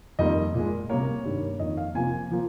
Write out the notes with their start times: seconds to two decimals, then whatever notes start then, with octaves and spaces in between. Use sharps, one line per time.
0.19 F2 D#3 G3 A#3 D#5
0.54 A#2 G#3
0.89 C3 G3 A#3 C#5
1.24 G2 D#3 G3 A#3
1.59 F2 D#3 A#3 D#5
1.77 F5
1.95 C3 F3 A#3 G#5
2.31 F3 A#3